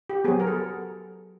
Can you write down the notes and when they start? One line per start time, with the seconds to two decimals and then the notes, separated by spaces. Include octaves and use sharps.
0.10 G4
0.24 F#3 B3 G#4
0.40 A#4
0.47 A4